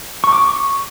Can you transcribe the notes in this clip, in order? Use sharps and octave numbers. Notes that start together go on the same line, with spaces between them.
C#6
D6
C#6